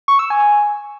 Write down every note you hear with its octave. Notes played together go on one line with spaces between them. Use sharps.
C#6
E6
G#5